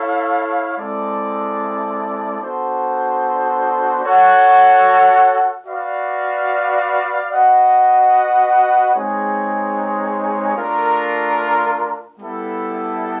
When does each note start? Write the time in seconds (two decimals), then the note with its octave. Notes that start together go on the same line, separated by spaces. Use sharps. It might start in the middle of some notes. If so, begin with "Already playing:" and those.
Already playing: E4 A4 C#5 F5
0.77 G#3 C4 E4 A4 D5
2.40 B3 D4 F#4 A4 C5
4.03 F#4 A4 C#5 F#5
5.66 F#4 B4 D5 F5
7.30 F#4 B4 D#5 F#5
8.93 G#3 C4 D#4 G#4 C#5
10.56 A3 D4 F4 A#4
12.19 G3 B3 E4 A4